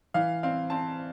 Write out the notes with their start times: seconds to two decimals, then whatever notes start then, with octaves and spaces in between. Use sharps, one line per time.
0.14 E3 F5
0.43 C4 F5
0.70 C4 A5